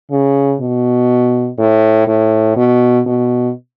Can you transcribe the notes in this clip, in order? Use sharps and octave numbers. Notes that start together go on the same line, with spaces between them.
C#3
B2
A2
A2
B2
B2